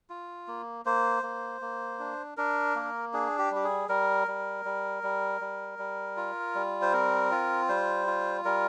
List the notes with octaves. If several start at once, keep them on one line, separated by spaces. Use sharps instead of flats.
F4
A#3
A#3 C5
A#3
A#3
D4
D4 A#4
A#3
D4 G#4
G4
G3 G4
G#4
G3 A#4
G3
G3
G3
G3
G3
F4
G3
C5
C4 A#4
F4
G3 C5
F4
G3 A#4